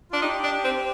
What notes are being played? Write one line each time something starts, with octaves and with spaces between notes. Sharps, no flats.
D4 F4
D#4 G4
D4
C4